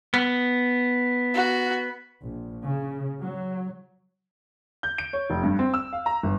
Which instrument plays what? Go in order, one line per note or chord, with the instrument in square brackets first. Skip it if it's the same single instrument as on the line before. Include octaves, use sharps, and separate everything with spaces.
[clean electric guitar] B3
[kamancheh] F#4
[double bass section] A#1
C#3
F#3
[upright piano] G6
D7
C#5
F1
G2
C4
E6
F5
A#5
G1